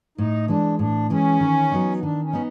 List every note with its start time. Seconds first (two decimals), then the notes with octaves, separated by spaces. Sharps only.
0.18 A2 D#4
0.48 E3 G#3 D4
0.79 A2 D4
1.10 E3 G#3 C#4
1.41 D#3
1.72 F#3 B3 D#4
2.02 D#3 D4
2.23 C#4
2.33 B3 D#4